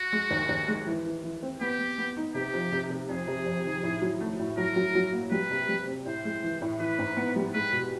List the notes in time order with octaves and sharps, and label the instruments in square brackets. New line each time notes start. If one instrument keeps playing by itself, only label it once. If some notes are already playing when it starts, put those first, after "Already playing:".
Already playing: [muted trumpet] F#4
[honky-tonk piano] G#3
D#2
D#2
G#3
E3
E3
E3
C4
[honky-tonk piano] B3 [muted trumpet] G4
[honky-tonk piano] B3
B3
D#4
[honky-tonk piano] C3 [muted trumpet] G4
[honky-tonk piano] F3
C3
C3
[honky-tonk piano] F2 [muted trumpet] G#4
[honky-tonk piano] C3
F2
D#3
A2
F#3
A3
A2
[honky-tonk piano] F#3 [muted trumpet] A#4
[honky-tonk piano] F#3
F#3
A#3
[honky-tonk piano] G3 [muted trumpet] B4
[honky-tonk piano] C3
G3
C4
[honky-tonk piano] A2 [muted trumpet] C5
[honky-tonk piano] G#3
E3
A2
[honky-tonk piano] E3 [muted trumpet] B4
[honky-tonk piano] G#2
B3
G3
[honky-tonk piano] G#3 [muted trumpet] B4
[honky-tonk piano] B2